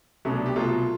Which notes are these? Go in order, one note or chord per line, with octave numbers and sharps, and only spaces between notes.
C2 B2 F#3 A3 C#4
D4
G4
C2 B2 F#3 A3 F4